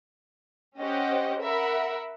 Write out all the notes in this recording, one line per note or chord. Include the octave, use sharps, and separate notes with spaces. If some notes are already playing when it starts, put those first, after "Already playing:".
C#4 G4 C5 D#5 F#5
A#4 E5 F#5 B5